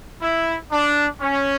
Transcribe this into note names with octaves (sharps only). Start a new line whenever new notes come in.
E4
D4
C#4